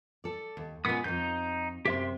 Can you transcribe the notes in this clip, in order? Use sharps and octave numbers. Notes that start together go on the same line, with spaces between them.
A4 D5
D#2
A#2 G#3 B3 C#4 D#6
F2 G#2 D#4 G6
F#2 C3 G4 E5 C6